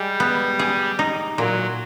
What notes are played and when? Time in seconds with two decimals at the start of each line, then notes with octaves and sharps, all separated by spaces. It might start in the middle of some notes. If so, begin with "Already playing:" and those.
Already playing: G3 G#3
0.20 B3
0.59 G#4
0.99 D#4
1.38 A#2 F#3